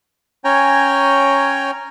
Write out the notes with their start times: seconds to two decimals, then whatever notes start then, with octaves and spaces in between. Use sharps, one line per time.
0.44 C#4 C#5 G5 G#5 A#5